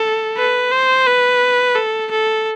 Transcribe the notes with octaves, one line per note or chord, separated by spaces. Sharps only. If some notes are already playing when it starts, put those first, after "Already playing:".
Already playing: A4
B4
C5
B4
A4
A4